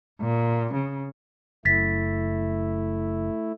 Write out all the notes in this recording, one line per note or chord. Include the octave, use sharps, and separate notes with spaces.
A#2
C#3
F#1 A3 E4 A6 B6